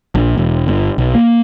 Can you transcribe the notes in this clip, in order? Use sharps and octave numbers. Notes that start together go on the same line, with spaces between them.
A#1
E1
G1
B1
A#3